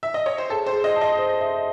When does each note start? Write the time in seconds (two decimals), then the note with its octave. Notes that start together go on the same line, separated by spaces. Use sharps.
0.03 E5
0.14 D#5
0.26 C#5
0.38 C5
0.49 G#4 A4
0.66 C5
0.72 G#4
0.84 D#5
0.96 A5
1.01 D#5
1.19 C5
1.41 E5